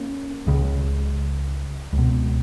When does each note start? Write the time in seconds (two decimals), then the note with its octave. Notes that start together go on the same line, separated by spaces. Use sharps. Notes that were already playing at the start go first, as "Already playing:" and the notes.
Already playing: A#3 C#4
0.47 C#2 C#3
1.93 C#2
1.98 B2